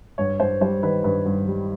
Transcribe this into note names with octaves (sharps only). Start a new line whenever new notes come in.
G2 C#5
G2 C5
G3 C5
D#3 B4
G2 B4
G2
G3